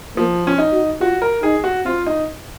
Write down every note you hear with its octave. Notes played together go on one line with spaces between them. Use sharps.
F3 A#3
C#4 F4
D#4
F#4
F4 F#4
A#4
D#4 G#4
F#4
C4 F4
D#4